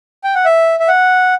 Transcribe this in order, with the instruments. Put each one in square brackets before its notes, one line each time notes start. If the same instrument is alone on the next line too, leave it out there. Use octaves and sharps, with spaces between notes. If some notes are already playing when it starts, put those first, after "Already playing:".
[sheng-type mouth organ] G5
F#5
E5
E5
F#5